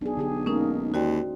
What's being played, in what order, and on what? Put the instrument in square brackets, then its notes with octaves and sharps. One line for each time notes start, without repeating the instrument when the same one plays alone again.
[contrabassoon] B1 [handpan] D4 G#4
[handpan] D3 G4 G#4
[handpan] G#3 A#3 A#4 [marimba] C#4 D#4
[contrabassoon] D#2 [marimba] F#4 D5 G5 [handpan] C5